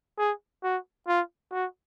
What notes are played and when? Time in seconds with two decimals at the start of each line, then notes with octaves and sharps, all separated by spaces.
0.18 G#4
0.64 F#4
1.08 F4
1.52 F#4